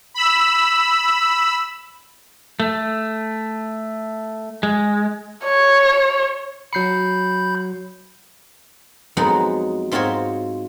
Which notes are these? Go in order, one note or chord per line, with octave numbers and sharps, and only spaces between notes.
B5 E6
A3
G#3
C#5
F#3 B5 G6 C7 C#7
F2 F#3 G#3 B3 D#4 F#5
G#2 C4 F4 F#4 C#5 C6